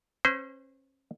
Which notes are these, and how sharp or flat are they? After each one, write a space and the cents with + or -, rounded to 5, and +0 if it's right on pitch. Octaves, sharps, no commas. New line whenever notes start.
C#4 -40 C5 -30